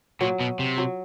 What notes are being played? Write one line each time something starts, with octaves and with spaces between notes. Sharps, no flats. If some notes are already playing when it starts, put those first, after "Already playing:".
A#2 F#3
B2
C3
F#3